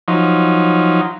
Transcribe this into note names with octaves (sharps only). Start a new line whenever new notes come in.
F3 F#3 D#4